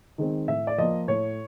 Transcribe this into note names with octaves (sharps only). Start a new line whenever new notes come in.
D#3 G#3 C4
A2 E5
D5
F3 A#3 D#5
A2 C#5